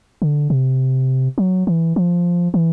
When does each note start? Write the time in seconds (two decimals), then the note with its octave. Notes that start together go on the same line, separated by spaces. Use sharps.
0.22 D3
0.50 C3
1.38 F#3
1.67 E3
1.96 F3
2.54 E3